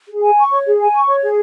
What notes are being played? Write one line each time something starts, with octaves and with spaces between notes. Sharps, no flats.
G#4
G#5
C#6
C#5
G#4
G#5
C#6
C#5
G#4